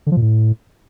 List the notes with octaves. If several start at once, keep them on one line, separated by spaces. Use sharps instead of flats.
D3
F3
A#2
A2